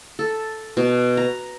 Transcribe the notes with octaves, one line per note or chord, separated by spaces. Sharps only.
A4
B2
A#5